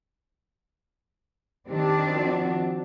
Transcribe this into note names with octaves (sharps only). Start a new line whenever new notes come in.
D#3 C4 D4 G4
F3 F#4